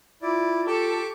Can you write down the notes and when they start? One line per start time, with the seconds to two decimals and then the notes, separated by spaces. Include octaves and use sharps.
0.22 E4 F4 D5
0.67 G4 A4 C#6 D6